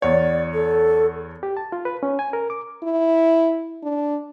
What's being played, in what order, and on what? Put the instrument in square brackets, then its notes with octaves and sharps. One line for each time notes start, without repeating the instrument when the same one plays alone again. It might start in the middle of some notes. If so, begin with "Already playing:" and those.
[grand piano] E2 C#5 [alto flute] D5
[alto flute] A4
[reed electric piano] G4
A5
F4
B4
C#4
G#5
A#4
D6
[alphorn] E4
D4